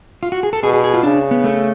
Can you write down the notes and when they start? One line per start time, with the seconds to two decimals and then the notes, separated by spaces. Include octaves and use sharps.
0.23 F4
0.32 F#4
0.43 G#4
0.53 A4
0.63 B2 G#4
0.73 G#4
0.84 G#4
0.94 F4
1.03 C#3 D4
1.31 B3
1.44 A3